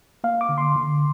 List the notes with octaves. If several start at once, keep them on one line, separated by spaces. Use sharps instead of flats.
A#3 F5
D6
D3
C6
D3